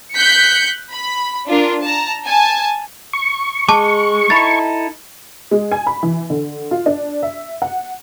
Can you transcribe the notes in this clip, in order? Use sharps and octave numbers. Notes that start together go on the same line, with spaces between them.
F#6 G6 B6 C#7
B5
D4 F4 A#4
A5 A#5
G#5 A5
C#6
G#3 A5 D6
D#4 E4 A4 B5 A6
G#3
G#5
B5
E3
D3
F4
D4
E5
F#5